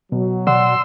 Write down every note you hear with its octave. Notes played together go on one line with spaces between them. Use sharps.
B2 F#3
B2 D5 F#5 C6 E6